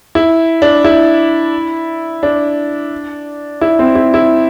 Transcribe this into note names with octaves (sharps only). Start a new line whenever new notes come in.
E4
D4
E4
D4
E4
C4
E4
E4